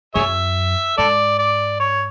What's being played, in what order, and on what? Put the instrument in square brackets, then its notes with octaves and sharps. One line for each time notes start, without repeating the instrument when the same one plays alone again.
[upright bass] F#2 [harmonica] G#4 C#5 E5
[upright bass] G#2 [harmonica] A4 D5
[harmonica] D5
C#5